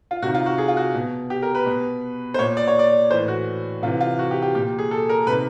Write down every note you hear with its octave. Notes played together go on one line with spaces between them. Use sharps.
F4
C3 D#3 F#4
F4
F#4
G#4
F4
F#4
B2
G4
A#4
B4
B2
C5
A#2 C#5
D5
C#5
D5
A2 E3 C5
F#4
C3 E3 F4
F4
F#4
G4
G4
A#2 G4
G#4
A4
A#4
C3 D#3 B4